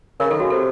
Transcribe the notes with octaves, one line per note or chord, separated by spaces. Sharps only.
C#3 A#4
D#3 A4
C#3 F#4
C3 A4